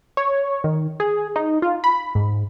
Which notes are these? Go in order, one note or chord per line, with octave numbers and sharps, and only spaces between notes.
C#5
D#3
G#4
D#4
F4
B5
G#2